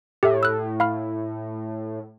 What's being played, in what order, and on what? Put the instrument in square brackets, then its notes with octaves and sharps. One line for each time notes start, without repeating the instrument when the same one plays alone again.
[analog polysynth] A2 [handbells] G4 A4 E5
[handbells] E6 F#6
F5 B5 F6